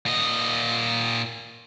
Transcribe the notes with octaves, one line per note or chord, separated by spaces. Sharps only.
A#2 D#5